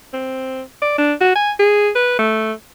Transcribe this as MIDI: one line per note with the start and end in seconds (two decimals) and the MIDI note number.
0.13 0.62 60
0.82 0.94 74
0.98 1.13 62
1.21 1.36 66
1.36 1.52 80
1.60 1.90 68
1.95 2.15 71
2.19 2.52 57